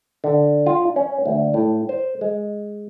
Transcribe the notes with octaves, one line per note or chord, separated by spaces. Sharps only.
D3
F4
C#4
D2
A2
C5
G#3